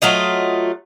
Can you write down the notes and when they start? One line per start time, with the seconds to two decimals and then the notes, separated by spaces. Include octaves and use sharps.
0.02 F#3 A3 F4 D#5